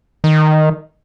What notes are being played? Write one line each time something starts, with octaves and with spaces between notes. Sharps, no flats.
D#3